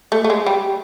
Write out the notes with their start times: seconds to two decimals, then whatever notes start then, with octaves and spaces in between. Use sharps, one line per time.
0.12 A3
0.24 A3
0.30 G#3
0.46 G3